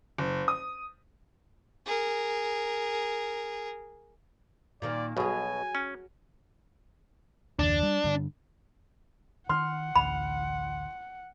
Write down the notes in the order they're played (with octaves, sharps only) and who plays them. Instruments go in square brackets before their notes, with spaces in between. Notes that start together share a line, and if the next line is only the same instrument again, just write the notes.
[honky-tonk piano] F#1
D#6
[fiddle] G#4 A#4
[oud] A#2 D#3 A#3 [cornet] D5
[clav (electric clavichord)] B1 B2 [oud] F#3 G#4 [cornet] G#5
[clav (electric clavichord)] C#4
[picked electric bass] F#1 D#2 [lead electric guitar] D4
[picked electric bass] G3
G2 D3
[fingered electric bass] D#3 [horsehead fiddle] F#5 [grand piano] C6 F6
[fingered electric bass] A1 D2 D3 [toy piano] B5